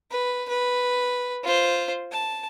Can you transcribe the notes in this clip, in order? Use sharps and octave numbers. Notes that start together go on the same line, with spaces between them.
B4
B4
F4 C5
A5